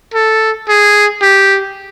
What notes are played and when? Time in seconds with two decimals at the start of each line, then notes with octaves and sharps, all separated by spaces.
0.14 A4
0.69 G#4
1.22 G4